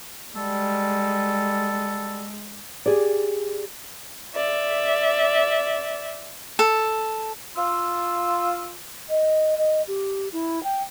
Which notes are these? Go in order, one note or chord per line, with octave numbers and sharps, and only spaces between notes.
G3 G#3 A4
G4 G#4 D5
D5 E5
A4
F4 E6
D#5
D#5
G4
E4
G5